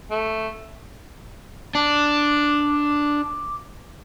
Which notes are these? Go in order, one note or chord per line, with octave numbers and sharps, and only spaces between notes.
A3
D4 D6